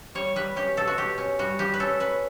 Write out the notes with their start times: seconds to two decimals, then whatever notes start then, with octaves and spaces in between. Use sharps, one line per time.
0.15 G3 C#5
0.36 G3 B4
0.56 C#4 G4
0.77 B2 A4
0.87 F#4
0.98 B2 G4
1.18 C#4
1.39 G3 F#4
1.59 G3 G4
1.74 B4
1.80 C#4 A4
2.00 C#4 B4